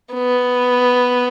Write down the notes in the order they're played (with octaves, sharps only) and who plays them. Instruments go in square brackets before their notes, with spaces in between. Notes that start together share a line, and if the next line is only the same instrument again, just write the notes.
[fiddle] B3